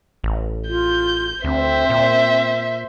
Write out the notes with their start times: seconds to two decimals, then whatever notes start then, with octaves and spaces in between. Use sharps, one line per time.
0.24 A1
0.68 F4 G6
1.44 D2 C4 C5 E5
1.90 A#2